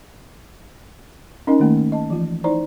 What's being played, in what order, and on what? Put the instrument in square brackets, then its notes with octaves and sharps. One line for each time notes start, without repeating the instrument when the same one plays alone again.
[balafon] C#4 D#4 A#4 D#5 G#5
D#3 A3 A#3
D#5 A5
E3 F3 F4
D#4 E4 C5 D5 A#5